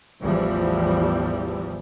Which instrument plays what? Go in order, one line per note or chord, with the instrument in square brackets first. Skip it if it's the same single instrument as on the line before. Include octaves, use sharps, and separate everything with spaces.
[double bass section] A1 E2 E3 F3 G3